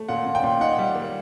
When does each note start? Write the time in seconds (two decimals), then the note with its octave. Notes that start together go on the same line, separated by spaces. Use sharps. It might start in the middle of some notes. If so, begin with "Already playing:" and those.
Already playing: A3
0.08 A#2 F#5
0.26 A#2
0.35 G5
0.44 A#2
0.61 D#4 F#5
0.79 G3
0.95 A#3